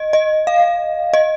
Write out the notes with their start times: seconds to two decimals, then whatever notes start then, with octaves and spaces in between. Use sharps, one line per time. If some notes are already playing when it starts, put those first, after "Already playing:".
Already playing: D#5
0.13 D#5
0.47 F5
1.14 D#5